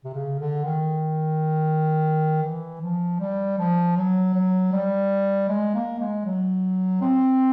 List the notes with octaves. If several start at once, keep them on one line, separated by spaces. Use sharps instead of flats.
C3
C#3
D3
D#3
E3
F3
G3
F3
F#3
F#3
G3
G#3
A#3
G#3
F#3
C4